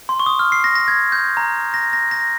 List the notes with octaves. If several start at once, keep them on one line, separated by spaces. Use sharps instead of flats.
C6
C#6
D#6
F6
C7
A#6
A#6
G#6
G6
A#5
A#6
A#6
A#6